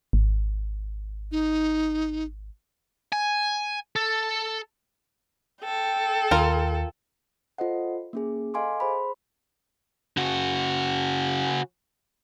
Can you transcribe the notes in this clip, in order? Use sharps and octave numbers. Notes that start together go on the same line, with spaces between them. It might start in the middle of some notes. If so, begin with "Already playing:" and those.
G#1
D#4
G#5
A4
A4 G5
D#2 F4 A#4
F4 A4 C5 D#5 F#5
A#3 C#4 G#4
A4 D#5 F5 G#5 C6 D6
G#4 C5 B5 C6
C#3 F#4